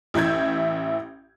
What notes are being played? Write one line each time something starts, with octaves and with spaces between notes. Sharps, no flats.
A1 E4 E5 G6 G#6